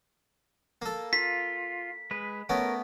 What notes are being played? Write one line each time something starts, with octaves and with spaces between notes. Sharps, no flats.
A#3 A4
F4 B6
G#3 B4
A3 B3 C#4 A#4